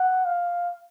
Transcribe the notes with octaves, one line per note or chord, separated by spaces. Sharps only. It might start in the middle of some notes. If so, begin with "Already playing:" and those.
Already playing: F#5
F5